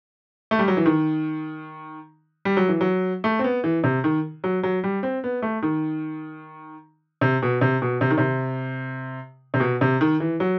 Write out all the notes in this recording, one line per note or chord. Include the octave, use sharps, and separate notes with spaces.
A3
G3
F#3
E3
D#3
G3
F#3
E3
F#3
A3
C4
B3
E3
C3
D#3
F#3
F#3
G3
C4
B3
A3
D#3
C3
B2
C3
B2
C3
D#3
C3
C3
B2
C3
D#3
E3
F#3